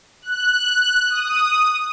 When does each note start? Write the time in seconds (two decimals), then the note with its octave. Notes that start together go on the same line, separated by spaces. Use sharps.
0.22 F#6
1.10 D#6